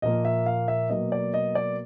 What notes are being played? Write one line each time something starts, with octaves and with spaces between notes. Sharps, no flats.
A#2 F3 A#3 D#5
E5
F5
E5
B2 F#3 A#3 D#5
D5
D#5
D5